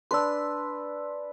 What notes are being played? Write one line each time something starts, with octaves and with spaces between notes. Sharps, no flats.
D4 B4 C6 E6